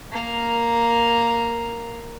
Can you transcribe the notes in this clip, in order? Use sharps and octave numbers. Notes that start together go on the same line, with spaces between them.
A#3 A#4